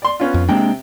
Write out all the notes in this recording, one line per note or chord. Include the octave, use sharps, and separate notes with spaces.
D5 C6
B3 C#4 F4
F2
C3 G#3 A#3 D4 G5